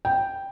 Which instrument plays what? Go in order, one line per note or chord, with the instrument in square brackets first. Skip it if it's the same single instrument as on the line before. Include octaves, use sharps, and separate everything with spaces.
[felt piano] G5